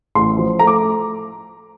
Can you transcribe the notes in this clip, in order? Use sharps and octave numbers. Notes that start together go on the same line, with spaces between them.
A1 C6
F3
A3 A#5
D6